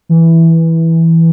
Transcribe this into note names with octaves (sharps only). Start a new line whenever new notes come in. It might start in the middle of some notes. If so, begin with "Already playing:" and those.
E3